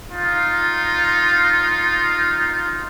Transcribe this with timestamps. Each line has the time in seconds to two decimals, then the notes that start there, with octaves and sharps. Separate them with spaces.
0.11 D#4 F4